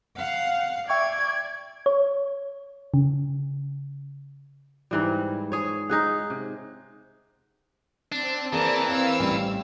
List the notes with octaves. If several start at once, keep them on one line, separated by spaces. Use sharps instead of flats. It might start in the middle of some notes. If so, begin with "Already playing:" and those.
F5 F#5
D5 E5 G5 C#6 G#6
C#5
C#3
G#2 E3 G3
G#4 C#5
D#4 G#4 F#5
C3
C4 D4
E3 A#3 G#4 A#4 D5 A5
A#4 C#5 F5 E6
A1 G3